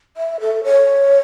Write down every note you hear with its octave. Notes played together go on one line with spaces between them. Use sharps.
E5
A4
C#5